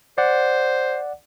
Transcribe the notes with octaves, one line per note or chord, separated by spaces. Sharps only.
C5 D5 F#5